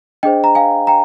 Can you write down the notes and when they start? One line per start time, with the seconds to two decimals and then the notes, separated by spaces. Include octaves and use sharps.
0.23 D4 G#4 C5 D#5 G5
0.44 A#5
0.55 F5 G#5
0.87 G5 A#5